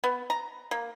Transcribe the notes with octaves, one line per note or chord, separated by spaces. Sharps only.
B3
A#5
A#3